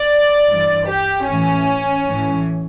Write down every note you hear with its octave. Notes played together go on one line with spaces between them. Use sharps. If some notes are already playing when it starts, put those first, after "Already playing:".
Already playing: D5
G2 E3
G4
A2 E3 C#4
A2 E3